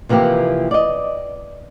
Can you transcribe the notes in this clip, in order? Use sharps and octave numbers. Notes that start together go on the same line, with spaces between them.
C3 E3 F3 A#3 G4
D5 D#5